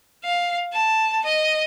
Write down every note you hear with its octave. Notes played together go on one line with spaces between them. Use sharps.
F5
A5
D#5